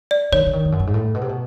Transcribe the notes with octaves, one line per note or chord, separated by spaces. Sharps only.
D5
D#3 C#5
D3
D#3
F2
F#2
G2
G#2
A2
B2
C3
B2